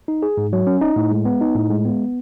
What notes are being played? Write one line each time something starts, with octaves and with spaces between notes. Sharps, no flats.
D#4
G#4
G#2
F#3
C#4
D#4
A2
G#3
B3
D#4
A2
G#3
B3